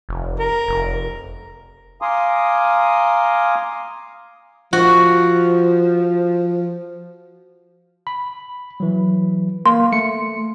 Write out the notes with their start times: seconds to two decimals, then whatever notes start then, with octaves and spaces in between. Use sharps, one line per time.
0.09 F1
0.39 A#4
0.68 F1
2.02 F5 G#5 A#5 C6 D6 D#6
4.73 F3 F#4
8.07 B5
8.80 E3 F#3
9.66 A#3 C6
9.92 A3 C#7